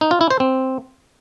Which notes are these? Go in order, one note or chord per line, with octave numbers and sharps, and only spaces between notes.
D#4
F4
E4
C5
C4